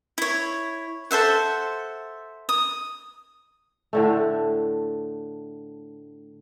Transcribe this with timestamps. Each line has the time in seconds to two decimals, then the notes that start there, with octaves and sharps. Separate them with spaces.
0.18 E4 C#5
1.11 A4 C5 E5 F#5
2.49 D#6
3.93 A2 D3 A3